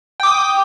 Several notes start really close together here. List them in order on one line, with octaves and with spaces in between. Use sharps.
G5 D6 D#6